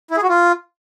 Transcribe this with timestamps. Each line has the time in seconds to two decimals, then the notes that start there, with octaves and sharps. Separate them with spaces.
0.11 E4
0.17 G#4
0.23 F#4
0.29 F4